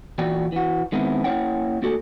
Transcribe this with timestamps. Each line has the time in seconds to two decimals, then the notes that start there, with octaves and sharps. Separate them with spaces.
0.18 A#2 E3 F#4 D5 G5
0.52 E3 F#4
0.92 D#3 G#3 B3 C4 E4
1.24 A#3 C#4 E4 C#5 F#5 G5
1.82 A3 A#3 F#4 A4